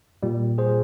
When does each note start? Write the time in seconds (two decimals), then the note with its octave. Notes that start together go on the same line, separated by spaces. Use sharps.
0.23 A#2 G3
0.58 G#4 C5